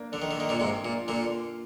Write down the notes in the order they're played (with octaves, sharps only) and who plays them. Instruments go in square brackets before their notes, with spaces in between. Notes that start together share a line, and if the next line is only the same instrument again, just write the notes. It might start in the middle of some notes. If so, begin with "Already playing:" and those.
Already playing: [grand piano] A#3 D4
[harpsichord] D3 [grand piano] D4
[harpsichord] D#3
D3
[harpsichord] D#3 [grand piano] A#3
[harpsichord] A#2 D3
[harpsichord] G#2 C3 [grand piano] A#3
[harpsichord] A#2 [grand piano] F4
[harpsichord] A#2 D3 [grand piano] F4
[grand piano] A#3